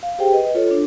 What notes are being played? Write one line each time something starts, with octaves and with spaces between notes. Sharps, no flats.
F5
G4 G#4 C5 G5
B4 D#5
F4 A4 C#5
D4